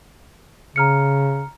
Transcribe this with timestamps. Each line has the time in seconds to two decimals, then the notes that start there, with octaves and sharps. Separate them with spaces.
0.76 C#3 A#5 F6 C#7